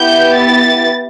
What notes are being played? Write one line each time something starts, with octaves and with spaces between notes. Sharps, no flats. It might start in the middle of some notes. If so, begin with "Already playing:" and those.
Already playing: B3 E4 G4 G6
A6